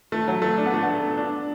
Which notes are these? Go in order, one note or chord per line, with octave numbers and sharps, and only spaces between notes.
A3
F#3
A3
D4
B3
A3
B3
D4